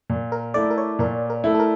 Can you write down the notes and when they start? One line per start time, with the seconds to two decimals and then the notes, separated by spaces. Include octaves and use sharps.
0.10 A#2
0.32 A#4
0.54 A3 E4 D5
0.71 A#4
0.78 C#5
0.99 A#2 A#4
1.30 A#4
1.44 A3 E4
1.55 A4
1.60 A#4